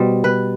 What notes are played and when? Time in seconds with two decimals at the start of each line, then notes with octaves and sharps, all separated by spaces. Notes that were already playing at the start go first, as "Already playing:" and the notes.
Already playing: B2 G3 C5
0.24 B4